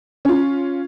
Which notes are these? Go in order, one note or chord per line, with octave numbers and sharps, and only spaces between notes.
C#4 F4